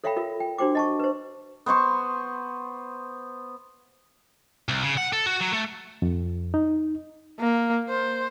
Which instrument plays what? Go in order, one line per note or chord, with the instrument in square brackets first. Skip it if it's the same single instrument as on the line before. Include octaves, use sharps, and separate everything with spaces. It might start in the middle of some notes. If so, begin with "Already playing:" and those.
[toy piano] A4 C#5 E5 F5 G5 B5
F4 A#4 E5
G5
D4 F#4 C5 G5 D6
D#5 A5 C#6
B4 C5
[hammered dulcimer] B3 C5 C6 C#6
[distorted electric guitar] C2
C#3
F#5
A4
F#4
F#3
A3
[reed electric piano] F2
D#4
[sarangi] A#3
C5